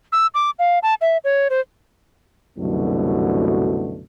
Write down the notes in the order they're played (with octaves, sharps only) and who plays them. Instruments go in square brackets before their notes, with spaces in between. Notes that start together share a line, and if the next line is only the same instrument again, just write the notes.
[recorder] E6
D6
F5
A5
E5
C#5
C5
[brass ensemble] C2 F#2 B2 D3 F#3 A3